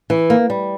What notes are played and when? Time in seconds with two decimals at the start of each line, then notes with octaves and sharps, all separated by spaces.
0.10 E3
0.30 A#3
0.50 G3